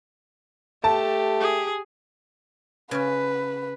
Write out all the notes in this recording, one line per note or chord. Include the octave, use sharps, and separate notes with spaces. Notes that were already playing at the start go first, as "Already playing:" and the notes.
A3 G4 A5
G#4
C#3 C#4 B4